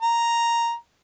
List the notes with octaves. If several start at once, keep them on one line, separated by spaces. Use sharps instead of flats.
A#5